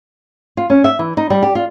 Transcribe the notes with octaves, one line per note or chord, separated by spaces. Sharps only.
F4
C#4
E5
E3
D#4
G3
G4
F4